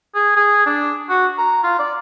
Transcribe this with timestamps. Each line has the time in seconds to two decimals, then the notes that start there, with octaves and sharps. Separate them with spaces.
0.15 G#4
0.36 G#4
0.66 D4
1.09 F#4
1.38 A#5
1.64 F4
1.79 D5